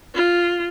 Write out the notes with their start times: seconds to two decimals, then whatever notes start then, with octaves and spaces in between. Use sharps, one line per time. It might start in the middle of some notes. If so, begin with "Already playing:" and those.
0.15 F4